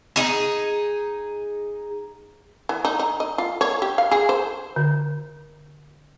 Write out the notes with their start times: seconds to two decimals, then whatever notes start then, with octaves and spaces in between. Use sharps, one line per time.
0.16 D#4 G#4
2.69 E3
2.85 D#4
2.99 D#4
3.20 D#5
3.38 F4
3.61 C#5
3.82 G4
3.98 F5
4.11 G#4
4.29 C5
4.76 D3